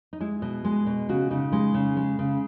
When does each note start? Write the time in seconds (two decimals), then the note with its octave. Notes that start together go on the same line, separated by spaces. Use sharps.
0.13 D#4
0.21 G#3 E4
0.42 B2
0.65 G#3
0.87 B2
1.09 C#3 F#4
1.30 C#3 D#4
1.52 G#3
1.74 C#3
1.97 G#3
2.19 C#3